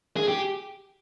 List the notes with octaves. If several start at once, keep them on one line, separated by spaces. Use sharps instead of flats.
G#4
G4